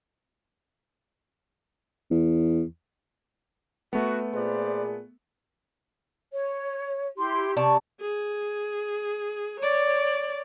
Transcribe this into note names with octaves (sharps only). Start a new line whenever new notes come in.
E2
A3 B3 F#4
A#2 G#4 B4 C5 D5
C#5
E4 G4 C6
C3 D5 A5 C#6
G#4
C#5 D5